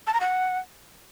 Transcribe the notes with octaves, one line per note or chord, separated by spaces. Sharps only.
A5
A#5
F#5